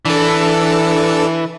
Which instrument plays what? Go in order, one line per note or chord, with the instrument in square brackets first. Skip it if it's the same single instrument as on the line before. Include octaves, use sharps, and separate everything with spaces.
[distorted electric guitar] E3 [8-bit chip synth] D4 A4